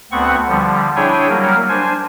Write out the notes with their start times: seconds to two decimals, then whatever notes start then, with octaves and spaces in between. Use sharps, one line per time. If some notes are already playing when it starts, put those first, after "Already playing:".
0.12 D2 B3 C4 F#5 C#6
0.49 D3 F3 G3
0.96 D4 E4 G#4 C#5 G5 G#5
1.30 F#3 G3 A#3 A#4
1.69 D4 C5 G#5